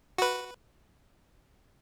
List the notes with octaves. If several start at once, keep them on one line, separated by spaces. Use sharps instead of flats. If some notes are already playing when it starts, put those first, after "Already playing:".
F#4 B4